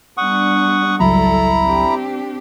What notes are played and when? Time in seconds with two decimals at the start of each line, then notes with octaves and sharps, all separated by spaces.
0.17 G3 B3 D4 F#5 C#6 D#6
1.00 G#1 C#2 F#3 G3 E4 A4 A#5 B5
1.61 C4 D4 G4